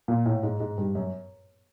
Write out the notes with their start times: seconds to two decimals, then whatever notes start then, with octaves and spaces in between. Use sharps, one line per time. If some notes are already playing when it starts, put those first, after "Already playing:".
0.08 A#2
0.26 A2
0.43 G#2
0.60 G#2
0.78 G2
0.95 F#2